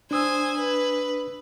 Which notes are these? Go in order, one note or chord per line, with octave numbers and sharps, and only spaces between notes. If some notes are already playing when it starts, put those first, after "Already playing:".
D4 C5 G#5 D#6 E6
B4